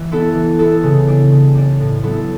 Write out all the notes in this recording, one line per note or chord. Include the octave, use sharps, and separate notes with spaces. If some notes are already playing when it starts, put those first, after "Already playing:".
Already playing: E3
B3 E4 A4
E3
B3 E4 A4
C#3
G3 D4
C#3
G3 D4
A2
F#3 B3 E4 A4